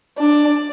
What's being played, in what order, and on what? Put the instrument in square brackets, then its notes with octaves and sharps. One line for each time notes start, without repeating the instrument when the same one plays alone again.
[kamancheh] D4 [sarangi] D5